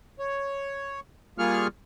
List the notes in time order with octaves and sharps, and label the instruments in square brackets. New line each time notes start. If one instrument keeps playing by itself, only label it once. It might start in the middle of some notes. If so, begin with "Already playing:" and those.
[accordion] C#5
G3 A#3 F4 G#4 C#6 F6